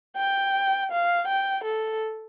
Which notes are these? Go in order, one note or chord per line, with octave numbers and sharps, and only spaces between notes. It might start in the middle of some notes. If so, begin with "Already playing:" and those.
G5
F5
G5
A4